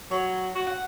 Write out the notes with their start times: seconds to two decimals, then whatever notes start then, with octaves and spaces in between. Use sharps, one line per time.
0.11 F#3 C#5
0.55 F#4
0.67 F#5